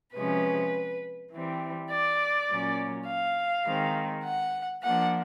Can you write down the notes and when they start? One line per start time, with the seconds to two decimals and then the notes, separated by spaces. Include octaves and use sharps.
0.15 C3 F3 G#3 C#4 B4
1.32 E3 G3 C4
1.91 D5
2.49 A#2 F#3 A#3 C#4
3.07 F5
3.66 D#3 G#3 C4
4.24 F#5
4.83 F3 A#3 D4 F#5